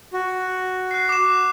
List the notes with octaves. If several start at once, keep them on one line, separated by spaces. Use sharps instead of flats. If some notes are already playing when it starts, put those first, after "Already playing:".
F#4
F#6 C7
D6 E7